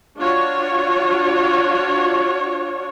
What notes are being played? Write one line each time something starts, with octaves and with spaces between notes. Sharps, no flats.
D4 F4 F#4 C#5